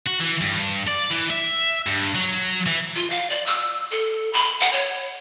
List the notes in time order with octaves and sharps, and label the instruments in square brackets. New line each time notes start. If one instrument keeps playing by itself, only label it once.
[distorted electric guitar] F#4
E3
G2
D5
E3
E5
G2
F#3
E3
[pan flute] F4
F5
D5
E6
A4
B5
F#5
C#5